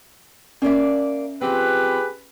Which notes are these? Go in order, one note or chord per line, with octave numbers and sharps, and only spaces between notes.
A#3 C#4 D5 E5 F5
F3 C4 G4 G#4 B4